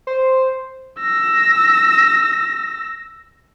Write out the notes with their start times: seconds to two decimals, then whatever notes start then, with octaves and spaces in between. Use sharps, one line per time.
0.07 C5
1.00 E6 A#6